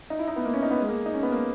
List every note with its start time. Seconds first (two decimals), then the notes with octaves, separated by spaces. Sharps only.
0.10 D#4
0.19 E4
0.28 D#4
0.36 B3
0.45 A#3
0.54 C#4
0.63 D#4
0.71 B3
0.80 G#3
0.88 A#3
1.06 D#4
1.14 C#4
1.23 B3
1.32 A#3